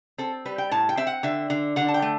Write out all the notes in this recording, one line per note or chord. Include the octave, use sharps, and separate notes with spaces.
C4 A4
G3 B4
G5
A2 A5
G5
C4 E5
F#5
D3 E5
D3
D3 F#5
A5
G5
A3